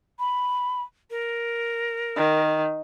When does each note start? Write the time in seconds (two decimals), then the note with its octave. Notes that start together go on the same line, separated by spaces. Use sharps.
0.19 B5
1.11 A#4
2.17 D#3